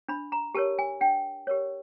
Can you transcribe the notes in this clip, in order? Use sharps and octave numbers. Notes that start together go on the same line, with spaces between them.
D4 B5
A#5
G4 A#4 C#5 A5
G#5
D4 G5
G4 A#4 C#5